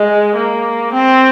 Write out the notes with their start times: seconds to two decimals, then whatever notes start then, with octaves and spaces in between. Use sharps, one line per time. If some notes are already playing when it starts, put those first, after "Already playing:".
Already playing: G#3
0.36 A#3
0.94 C4